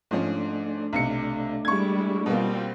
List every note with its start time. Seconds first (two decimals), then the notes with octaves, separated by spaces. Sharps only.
0.11 G#2 F3 A3 C#4 D4
0.93 B1 C3 C#7
1.65 G3 G#3 E4 C#6 G#6
2.26 B2 G3 A#3 C4 F4